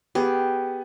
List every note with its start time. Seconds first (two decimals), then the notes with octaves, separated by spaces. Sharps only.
0.15 B3 G4 G#4